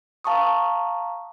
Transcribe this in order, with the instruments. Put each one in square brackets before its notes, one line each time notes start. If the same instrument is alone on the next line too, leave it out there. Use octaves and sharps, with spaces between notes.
[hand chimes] F5 A5 A#5 C#6 D#6